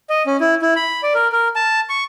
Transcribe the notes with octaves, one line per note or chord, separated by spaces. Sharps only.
D#5
C#4
E4
E4
B5
D5
A#4
A#4
A5
C#6